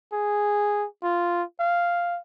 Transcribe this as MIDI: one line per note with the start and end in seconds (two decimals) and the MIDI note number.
0.13 0.86 68
1.03 1.43 65
1.60 2.19 77